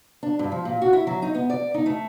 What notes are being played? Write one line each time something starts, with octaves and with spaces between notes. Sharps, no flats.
D4
G2
F3
A#2
F#4
E4
F#3
D#4
B3
D5
D#4
A3